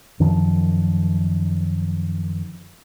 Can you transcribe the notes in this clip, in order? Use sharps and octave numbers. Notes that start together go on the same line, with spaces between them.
F#2 D#3 F3